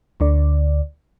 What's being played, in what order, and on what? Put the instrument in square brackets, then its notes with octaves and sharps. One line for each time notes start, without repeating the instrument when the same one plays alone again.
[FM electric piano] D2 D3 D5